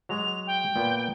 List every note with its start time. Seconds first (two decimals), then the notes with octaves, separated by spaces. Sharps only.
0.09 F#3 G#3 F7
0.47 G5
0.76 A#2 B3